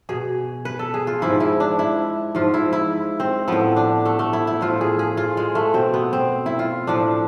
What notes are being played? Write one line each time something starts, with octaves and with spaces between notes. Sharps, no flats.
B2 G#4
B4
A4
G#4
F4
G#2 F3 E4
E4
D4
E4
G#2 F3 F4
E4
E4
C4
A2 F3 B3
D4
A3
A3
E4
E4
A2 F3 F4
G#4
G#4
F4
G#3
A3
B2 C4
B3
C4
E4
F4
A2 F3 D4